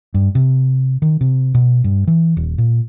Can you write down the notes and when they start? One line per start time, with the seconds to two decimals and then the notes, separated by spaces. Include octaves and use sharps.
0.14 G2
0.35 C3
1.02 D#3
1.21 C3
1.54 B2
1.84 G2
2.07 E3
2.37 D#1
2.58 A#2